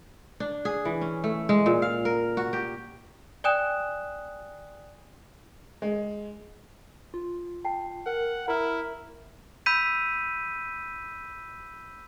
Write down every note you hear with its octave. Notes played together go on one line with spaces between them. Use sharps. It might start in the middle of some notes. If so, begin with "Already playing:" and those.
D4
G#4
E3
C#4
A3
G#3
A#2
F5
A#4
F#4
G4
D5 G5 G#5 D#6 F#6 E7
G#3
F4
G5 A5 C7
A#4 F#5
E4 A#4 A#5 F6
B5 E6 G6 B6 D#7